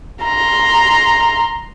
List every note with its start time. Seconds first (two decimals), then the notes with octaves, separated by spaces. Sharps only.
0.23 A#5 C6